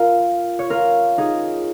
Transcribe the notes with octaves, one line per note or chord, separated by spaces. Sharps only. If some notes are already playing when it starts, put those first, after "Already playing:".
Already playing: F4 A#4
C#5
F4 A#4
D#4 G#4